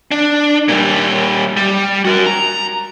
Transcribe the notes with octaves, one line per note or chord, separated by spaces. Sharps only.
D4
A#2 G3
G3
F#4 A#4
A#5